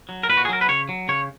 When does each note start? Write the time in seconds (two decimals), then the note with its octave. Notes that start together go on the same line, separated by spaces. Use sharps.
0.09 F#3
0.23 A#4
0.29 A#2 B4
0.37 F#4
0.45 G#4
0.49 F#3 A#4
0.61 B4
0.68 C#3 C#5
0.89 F#3
1.08 C#3 C#5